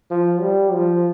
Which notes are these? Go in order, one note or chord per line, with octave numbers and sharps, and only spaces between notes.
F3
G3
F3